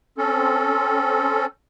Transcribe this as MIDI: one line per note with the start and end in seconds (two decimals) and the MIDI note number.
0.18 1.46 60
0.18 1.46 61
0.18 1.46 69